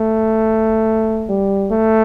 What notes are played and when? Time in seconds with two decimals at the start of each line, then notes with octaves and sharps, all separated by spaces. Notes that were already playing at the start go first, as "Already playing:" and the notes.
Already playing: A3
1.29 G3
1.72 A3